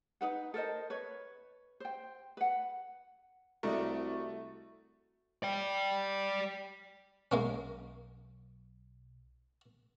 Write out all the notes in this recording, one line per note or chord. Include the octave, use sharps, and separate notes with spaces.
D#4 B4 F#5
A4 A#4 C5 D#5
B4 C#5
C5 G5
B4 F#5
C2 A3 F#4 A#4 D5 D#5
D5 G5
B1 G#3 A#3 C#4